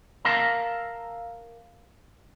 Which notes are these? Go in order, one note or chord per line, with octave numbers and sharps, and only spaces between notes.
A#4 E5 F5 A5 A#5